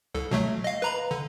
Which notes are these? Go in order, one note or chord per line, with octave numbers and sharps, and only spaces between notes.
C2 A4
B2 F#3 A3
D#5 F5
B4 A#5 B5
D3